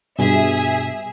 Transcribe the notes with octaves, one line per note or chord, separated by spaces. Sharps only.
G2 B2 G#4 E5 G#5